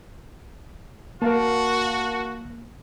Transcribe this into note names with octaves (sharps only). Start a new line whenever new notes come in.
A#3 F#4 A#4 F5 A5